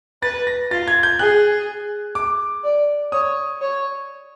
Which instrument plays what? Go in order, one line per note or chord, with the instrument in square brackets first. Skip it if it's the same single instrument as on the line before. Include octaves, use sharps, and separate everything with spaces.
[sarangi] B4 [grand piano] A6
[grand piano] A#6
[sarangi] F4 [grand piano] A6
[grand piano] G#6
G6
[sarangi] G#4 [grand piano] F#6
[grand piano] D6
[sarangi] D5
[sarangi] C#5 [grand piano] D#6
[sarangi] C#5